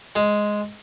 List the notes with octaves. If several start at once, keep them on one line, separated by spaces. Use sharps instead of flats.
G#3